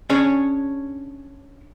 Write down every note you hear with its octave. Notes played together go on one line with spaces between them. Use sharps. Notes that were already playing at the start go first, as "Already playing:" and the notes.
C#4 D4 G#4 C#5